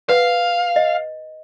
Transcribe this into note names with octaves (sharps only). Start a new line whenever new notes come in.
B4 F5 F#5
D#5